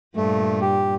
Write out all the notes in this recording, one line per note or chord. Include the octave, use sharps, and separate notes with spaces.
G2 A#2 A3
G4